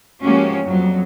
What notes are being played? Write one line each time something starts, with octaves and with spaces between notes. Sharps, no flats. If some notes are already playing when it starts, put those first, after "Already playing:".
F3 G#3 A#3 C#4 F#4 G4
F2 F#3 G3